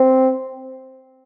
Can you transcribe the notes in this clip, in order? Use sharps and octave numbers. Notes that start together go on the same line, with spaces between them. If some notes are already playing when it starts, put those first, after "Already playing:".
Already playing: C4